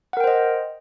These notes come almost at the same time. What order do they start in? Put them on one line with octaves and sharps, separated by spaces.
F#5 A#4 G5 C5 D#5